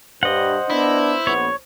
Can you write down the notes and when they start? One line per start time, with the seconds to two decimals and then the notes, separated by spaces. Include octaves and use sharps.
0.23 G2 C5 D#5 F#5
0.70 B3 D4 E4
1.27 A#1 B3 C#5